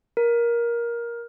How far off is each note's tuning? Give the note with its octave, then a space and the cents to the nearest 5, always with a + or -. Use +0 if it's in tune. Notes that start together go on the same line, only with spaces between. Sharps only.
A#4 +15